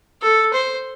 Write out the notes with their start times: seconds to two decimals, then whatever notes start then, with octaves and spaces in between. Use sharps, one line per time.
0.22 A4
0.53 C5